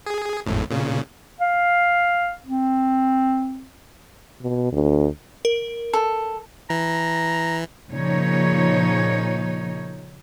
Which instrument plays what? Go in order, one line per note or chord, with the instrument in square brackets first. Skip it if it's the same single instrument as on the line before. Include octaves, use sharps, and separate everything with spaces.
[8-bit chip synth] G#4
G#1 F2 A2
A#2 C#3
[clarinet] F5
C4
[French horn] B2
D2
[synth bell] A#4
[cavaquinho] A4
[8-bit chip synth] E3 [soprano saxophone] A#5
[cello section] A#2 C#3 F3 D#4 C#5